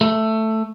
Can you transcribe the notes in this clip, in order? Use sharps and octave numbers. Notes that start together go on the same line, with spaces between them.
A3